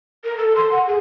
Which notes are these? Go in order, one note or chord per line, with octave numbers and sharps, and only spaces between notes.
A#4
A4
C6
F#5
G#4